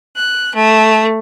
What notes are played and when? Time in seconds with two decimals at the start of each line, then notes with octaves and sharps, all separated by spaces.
0.17 F#6
0.56 A3